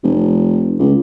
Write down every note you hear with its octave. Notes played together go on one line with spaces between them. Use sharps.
F1
C#2